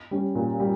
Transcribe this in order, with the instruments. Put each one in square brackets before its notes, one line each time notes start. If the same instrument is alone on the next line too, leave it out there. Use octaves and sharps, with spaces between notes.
[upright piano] G3 C#4
A#2
G3